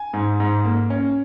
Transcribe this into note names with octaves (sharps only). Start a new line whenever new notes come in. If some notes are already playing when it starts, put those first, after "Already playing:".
Already playing: G#5
G#2
G#2
A#3
C#4